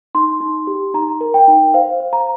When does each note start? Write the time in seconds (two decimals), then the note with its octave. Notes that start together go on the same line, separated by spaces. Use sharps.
0.15 D#4 C6
0.41 D#4
0.67 G4
0.94 D#4 A#5
1.21 A#4
1.34 G5
1.48 D#4
1.74 C5 F5
2.00 C5
2.13 A#5